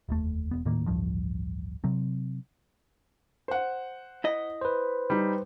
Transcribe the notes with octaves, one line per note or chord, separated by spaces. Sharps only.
F1 D#2 A3
E1 B3
D#1 A2 D#3 A#3
A1 D2 G2 F3
C3 F#3 C4
C5 F#5
E4 D#5
B4 C5
G3 D#4